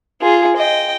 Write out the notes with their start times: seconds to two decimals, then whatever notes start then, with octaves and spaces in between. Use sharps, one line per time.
0.21 F4 G#4
0.57 D#5 G5